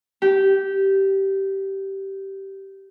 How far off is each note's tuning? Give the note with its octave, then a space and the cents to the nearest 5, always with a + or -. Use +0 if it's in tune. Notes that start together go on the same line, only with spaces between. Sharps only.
G4 -15